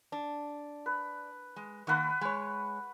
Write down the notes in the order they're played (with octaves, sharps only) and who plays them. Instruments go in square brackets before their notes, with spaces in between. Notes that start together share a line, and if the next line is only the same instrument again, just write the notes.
[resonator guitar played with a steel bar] D4
[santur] B4
[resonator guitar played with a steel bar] G#3
[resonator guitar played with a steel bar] D#3 A#3 [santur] B4 F#5 C#6
[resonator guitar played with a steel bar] G#3 C#5